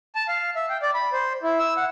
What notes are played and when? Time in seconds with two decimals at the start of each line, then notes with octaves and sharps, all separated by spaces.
0.15 A5
0.28 F5
0.56 E5
0.70 G5
0.82 D5
0.94 B5
1.12 C5
1.43 E4
1.59 E6
1.77 F#5